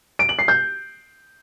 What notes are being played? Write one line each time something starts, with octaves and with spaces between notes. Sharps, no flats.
D7
F#7
C7
G6